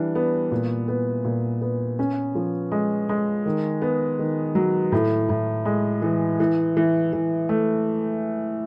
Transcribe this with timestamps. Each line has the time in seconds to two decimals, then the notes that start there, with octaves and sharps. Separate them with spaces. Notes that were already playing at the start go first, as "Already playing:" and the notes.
Already playing: E3 G3 D4
0.15 B3
0.52 A#2
0.88 B3
1.25 A#2
1.62 B3
1.99 C#4
2.35 F3
2.72 G#3
3.09 G#3
3.46 D#3
3.82 B3
4.19 D#3
4.55 F#3
4.92 A2
5.29 A2
5.65 G#3
6.02 E3
6.40 E3
6.77 E3
7.13 E3
7.49 A3